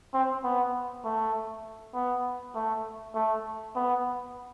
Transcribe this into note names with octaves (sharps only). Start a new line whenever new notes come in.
C4
B3
A3
B3
A3
A3
B3